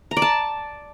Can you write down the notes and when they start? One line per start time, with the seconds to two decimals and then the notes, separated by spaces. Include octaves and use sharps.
0.11 A#5
0.17 D5
0.22 A5